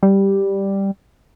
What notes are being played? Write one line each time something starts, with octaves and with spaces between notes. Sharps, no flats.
G3